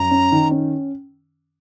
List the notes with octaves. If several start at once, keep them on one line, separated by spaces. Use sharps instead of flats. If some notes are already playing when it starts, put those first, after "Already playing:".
Already playing: F#2 A#5
C#4
D#3
C#4